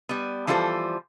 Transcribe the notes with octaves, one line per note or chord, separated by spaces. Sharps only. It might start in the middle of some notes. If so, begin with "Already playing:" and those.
G3 B3
E3 F3 G3 F4 A4 C5